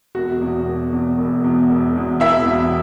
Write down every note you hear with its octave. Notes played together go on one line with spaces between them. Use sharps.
E1 F#4
E2 B2
E1
E2 B2
E1
E2 B2
E1
E2 B2
E1 E4 E5
E2 B2